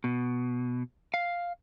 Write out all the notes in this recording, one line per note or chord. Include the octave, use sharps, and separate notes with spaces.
B2
F5